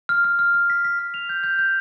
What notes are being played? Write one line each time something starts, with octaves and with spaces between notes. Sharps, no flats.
F6
F6
F6
F6
B6
B6
F6
F7
G6
G6
G6